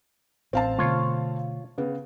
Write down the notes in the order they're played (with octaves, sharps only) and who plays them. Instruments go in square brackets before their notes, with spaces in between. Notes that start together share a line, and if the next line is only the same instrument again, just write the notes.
[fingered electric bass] A1 [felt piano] C4 F5 A5
[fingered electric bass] B2 D3 A3 [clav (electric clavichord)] F4 C#5
[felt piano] C#3 B3